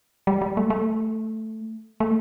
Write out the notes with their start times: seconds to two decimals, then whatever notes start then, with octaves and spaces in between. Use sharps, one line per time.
0.27 G3
0.42 G3
0.57 A3
0.70 A3
2.00 A3